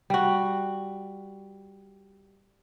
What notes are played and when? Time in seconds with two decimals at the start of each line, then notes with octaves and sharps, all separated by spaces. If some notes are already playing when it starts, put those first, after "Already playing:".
0.10 G3 F#4